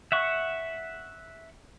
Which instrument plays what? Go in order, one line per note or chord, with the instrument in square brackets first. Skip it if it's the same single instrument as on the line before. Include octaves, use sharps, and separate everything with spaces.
[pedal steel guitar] E5 F#5 C#6